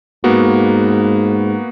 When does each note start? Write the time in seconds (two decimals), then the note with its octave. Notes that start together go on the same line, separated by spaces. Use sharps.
0.24 G#2 A#3 B3 F#4